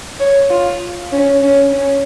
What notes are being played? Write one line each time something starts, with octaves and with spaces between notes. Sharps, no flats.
C#5
F4
C#4
C#4
C#4